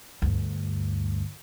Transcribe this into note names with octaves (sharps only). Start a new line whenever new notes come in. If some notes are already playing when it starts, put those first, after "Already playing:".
D2 G2